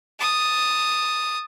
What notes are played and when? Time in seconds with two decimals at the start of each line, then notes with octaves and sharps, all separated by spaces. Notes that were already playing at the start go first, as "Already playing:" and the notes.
0.20 A5 D#6